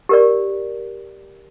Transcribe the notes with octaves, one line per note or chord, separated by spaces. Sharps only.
G4 A#4 D5